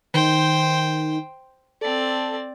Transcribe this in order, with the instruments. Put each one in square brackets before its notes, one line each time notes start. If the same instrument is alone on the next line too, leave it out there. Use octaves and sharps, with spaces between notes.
[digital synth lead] D#3 [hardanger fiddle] C5 G5
[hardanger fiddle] C4 D5 [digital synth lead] A4